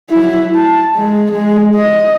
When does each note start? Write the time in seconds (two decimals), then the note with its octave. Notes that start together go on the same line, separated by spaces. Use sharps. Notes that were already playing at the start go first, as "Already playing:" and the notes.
0.10 F#3 E4
0.55 A5
0.96 G#3
1.31 G#3
1.76 D#5